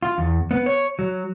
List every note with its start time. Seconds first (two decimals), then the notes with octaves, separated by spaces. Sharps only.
0.03 F4
0.18 E2
0.51 B3
0.66 C#5
0.99 F#3